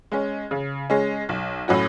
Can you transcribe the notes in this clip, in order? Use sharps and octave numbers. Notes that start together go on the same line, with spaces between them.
G#3 C#4
C#3
G#3 C#4
B1
A2 F#3 C#4 F#4